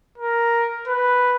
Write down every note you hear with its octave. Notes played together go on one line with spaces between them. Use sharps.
A#4
B4